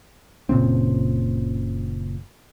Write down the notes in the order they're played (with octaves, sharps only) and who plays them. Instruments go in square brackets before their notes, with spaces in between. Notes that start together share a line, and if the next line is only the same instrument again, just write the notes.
[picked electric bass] F#1 A#2 C#3 C4